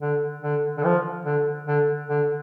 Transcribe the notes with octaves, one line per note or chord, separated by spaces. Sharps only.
D3
D3
D3
F3
D3
D3
D3